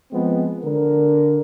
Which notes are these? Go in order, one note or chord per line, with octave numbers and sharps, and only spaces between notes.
F3 G#3 B3 C4
D3 A#4